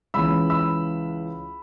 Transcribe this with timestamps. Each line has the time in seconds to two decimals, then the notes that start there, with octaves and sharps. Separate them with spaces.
0.14 C#2 C#3 E3 B5 E6
0.50 B5 E6